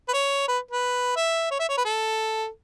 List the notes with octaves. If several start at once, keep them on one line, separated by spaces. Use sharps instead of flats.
B4
C#5
B4
B4
E5
C#5
E5
C#5
B4
A4